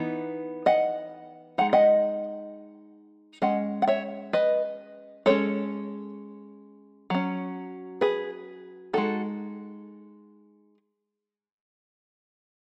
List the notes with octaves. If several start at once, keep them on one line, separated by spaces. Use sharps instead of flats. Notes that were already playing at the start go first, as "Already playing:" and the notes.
Already playing: E3 B3 D#4
D#5 F#5
G#3 D#4 F#5
D#5 F#5
G#3 C#4 D#5 F#5
F#5
C#5 E5
B4 D#5
G#3 C#4 A4 C#5
F#3 C#4
G#4 B4
G#3 D#4 F#4 A4